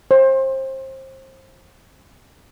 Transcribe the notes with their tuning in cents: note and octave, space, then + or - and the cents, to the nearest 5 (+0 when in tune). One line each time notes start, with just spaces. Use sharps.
C5 +30